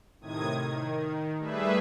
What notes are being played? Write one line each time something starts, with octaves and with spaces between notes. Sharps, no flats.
A2 C3 D#3 D#6 G#6
D#3
G3 A3 G#4 B4 E5